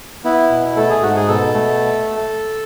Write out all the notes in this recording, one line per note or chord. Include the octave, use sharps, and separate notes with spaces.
B3 E4
B2
A3 A4
G#4
G#2 F#4
G#4
B2 A4
A3